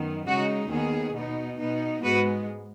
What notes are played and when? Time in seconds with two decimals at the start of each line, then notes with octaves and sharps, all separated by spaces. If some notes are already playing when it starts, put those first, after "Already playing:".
Already playing: F#2 D#3 B3
0.27 C#3 G#3 D#4 F#4
0.70 D#2 D#3 B3 G#4
1.14 B2 B3 D#4
1.58 B2 B3 D#4
2.03 G#2 G#3 B3 F#4 B4